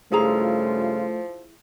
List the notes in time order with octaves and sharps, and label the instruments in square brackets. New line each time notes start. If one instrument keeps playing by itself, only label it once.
[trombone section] G2 C#3 F4 [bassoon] F3 [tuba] A3 [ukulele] E4 G#4 A#5